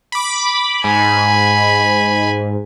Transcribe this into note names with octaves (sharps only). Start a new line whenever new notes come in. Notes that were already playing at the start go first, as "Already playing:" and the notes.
B5 D6
G#2 G#5 B5